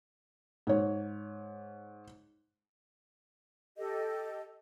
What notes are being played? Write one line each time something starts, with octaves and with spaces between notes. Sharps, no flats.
G#2 C#5
G4 A4 D#5